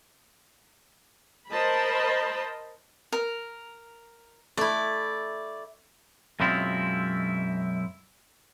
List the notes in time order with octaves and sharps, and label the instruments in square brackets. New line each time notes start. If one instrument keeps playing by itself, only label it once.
[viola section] A#4 C5 D#5 A5 B5
[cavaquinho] A#4
[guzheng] A3 E4 [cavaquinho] D5
[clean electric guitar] F#2 B2 G#3 C4 E4 F4